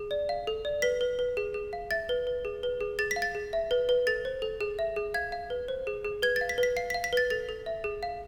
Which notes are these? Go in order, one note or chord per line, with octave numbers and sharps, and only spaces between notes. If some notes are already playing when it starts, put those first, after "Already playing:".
Already playing: G#4
D5
F5
A4
D5
B4 B6
B4
B4
G#4
G#4
F5
E5 A6
B4
B4
G#4
B4
G#4
G#4 A6
B6
F5
A6
G#4
E5
B4
B4
A4 A6
C5
A4
G#4
E5
G#4
F5 G#6
F5
B4
C5
G#4
G#4
B4 G#6
A6
F5
B6
B4
B6
F5 C7
F5 B6
B6
B4 A6
A4 A6
A4
E5
G#4
F5